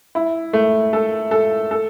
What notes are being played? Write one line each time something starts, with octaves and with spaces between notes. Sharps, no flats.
E4
A3
A4
A4
A4